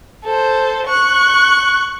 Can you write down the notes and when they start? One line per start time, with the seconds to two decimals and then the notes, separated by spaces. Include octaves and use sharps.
0.24 A4 C5
0.87 C#6 F#6